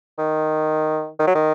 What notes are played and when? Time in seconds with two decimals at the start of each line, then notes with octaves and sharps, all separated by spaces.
0.19 D#3
1.19 D#3
1.27 F#3
1.35 D#3